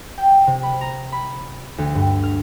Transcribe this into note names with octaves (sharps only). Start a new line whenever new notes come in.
G5
C3
B5
A#5
B5
D2
G2
F6